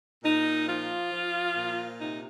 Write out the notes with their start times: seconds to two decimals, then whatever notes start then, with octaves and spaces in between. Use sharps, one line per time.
0.24 A#2 D#4
0.68 F3 F4
1.12 F3
1.56 A#2
2.00 C3 D#4